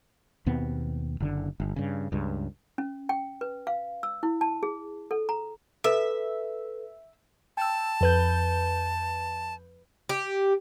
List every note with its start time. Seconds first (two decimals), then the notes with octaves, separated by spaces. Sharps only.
0.46 D#2 B2 B3 C4
1.20 F#1 D3
1.60 G1
1.76 G2 C#3
2.12 C#2 G2
2.78 C#4
3.09 G5
3.41 B4
3.67 F5
4.03 E6
4.23 E4
4.41 A5
4.63 G#4
5.11 A4
5.29 A#5
5.84 A4 B4 E5
7.57 G5 A5 E6
8.01 F2 B4 G6
10.09 G4